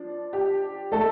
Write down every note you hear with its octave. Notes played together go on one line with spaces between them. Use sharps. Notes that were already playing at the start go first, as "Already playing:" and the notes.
Already playing: F3 D4
G4
A3 A4